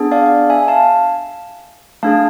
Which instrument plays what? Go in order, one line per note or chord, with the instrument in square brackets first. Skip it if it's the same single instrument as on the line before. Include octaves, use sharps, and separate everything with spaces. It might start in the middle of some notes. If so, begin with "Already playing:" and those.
Already playing: [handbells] B3 D4 G#4
D5 F5
E5 G#5
F5 A5
A3 D4 G#4 F5 A5